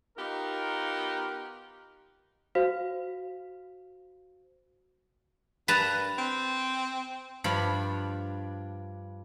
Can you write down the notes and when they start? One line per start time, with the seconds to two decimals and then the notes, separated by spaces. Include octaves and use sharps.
0.17 B3 D#4 F4 G4 A#4
2.55 F#4 C5 F5
5.68 G2 B4 A5 A#5
6.19 C4
7.44 G2 F3 D4 F5 B5